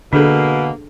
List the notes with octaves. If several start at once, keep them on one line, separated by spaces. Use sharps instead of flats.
B2 D3 A#3 D4 G#4 A4